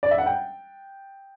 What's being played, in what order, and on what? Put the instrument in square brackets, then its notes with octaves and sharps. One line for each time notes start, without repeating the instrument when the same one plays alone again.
[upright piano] D5
E5
F#5
G5